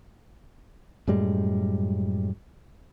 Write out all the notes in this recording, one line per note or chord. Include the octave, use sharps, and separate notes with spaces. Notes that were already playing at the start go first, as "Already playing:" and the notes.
F#2 A2 G3 G#3